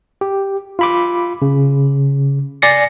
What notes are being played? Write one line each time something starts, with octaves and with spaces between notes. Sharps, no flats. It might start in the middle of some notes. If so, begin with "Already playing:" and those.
G4
F4 B5 D6
C#3
D5 G#5 A6 A#6 C7 C#7